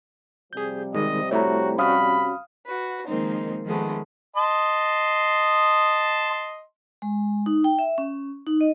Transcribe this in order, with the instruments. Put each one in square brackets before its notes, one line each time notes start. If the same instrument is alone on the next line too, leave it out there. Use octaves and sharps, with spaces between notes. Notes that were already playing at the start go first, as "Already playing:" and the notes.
[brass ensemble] C3 F3 G3 [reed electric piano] G#4 G6
[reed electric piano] D#3 G#3 [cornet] D#5
[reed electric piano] A3 E4 [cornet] F#4 [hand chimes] C#5 A#5
[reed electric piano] C#4 F#4 [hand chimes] F5 D#6 F6 [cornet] B5
[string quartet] F#4 B4
D#3 F3 G#3 A#3 C4 D#4
D#3 F3 G#3 A3 B3
[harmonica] D#5 A5 C6
[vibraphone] G#3
D#4
G5
E5
C#4
D#4
D#5